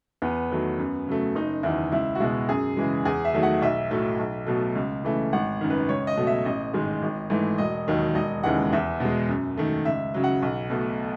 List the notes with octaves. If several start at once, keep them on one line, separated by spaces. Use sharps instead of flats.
E2 B3
D#3 F#3 A3
F#2
C#3 F#3 A3
F#1 D#4
E2 D#3 E4
C#2 E4
F#4
B2 G#3 E4
F#2 G#4
C#3 E3 G#3
E2 G#4
E5
D#3 F#3 A3
F#5
B1 E5
A2 F#3 A3
B1
B2 F#3 A3
C#2
C#3 E3 A3
G#1 F#5
F#2 D#3
B4
C#2 C#5
D#5
B2 F#3 A3
E5
A1 D#5
G#2 D#3 G#3
G#1
G#2 E3 A3
E1 D#5
D#2 D#3 F#3
E1 D#5
D#2 C#3 E3 G#3 F#5
E2 E5
B2 G#3
F#2
D#3 A3
C#2 E5
C#3 F#3
F#5
B1
B2 A3